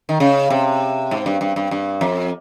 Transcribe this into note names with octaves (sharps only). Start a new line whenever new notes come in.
D#3
C#3
C3
G#2
G2
G2
G2
G2
F2